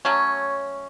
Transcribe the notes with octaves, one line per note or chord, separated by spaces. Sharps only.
F#3 A3 C#4